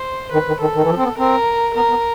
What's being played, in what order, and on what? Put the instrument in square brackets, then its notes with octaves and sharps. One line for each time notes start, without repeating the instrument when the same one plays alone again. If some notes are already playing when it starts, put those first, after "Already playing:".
Already playing: [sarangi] C5
[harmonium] D#3 [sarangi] B4
[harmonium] D#3
[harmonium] D#3 [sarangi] A4
[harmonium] D#3
E3
F3
C4
B3
[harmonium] C4 [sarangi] A#4
[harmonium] B3 [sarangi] A#4
[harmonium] B3